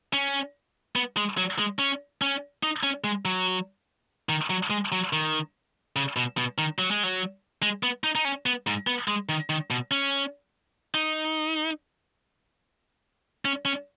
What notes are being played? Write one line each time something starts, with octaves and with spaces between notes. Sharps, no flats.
C#4
B3
G#3
F#3
G#3
C#4
C#4
D#4
C#4
G#3
F#3
D#3
F#3
G#3
F#3
D#3
C#3
B2
B2
D#3
F#3
G#3
F#3
G#3
B3
D#4
D#4
C#4
B3
G#2
B3
G#3
D#3
D#3
B2
C#4
D#4
C#4
C#4